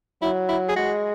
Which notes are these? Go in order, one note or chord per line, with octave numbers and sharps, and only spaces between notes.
F#3 E4
E4
G#4
G#3 F#4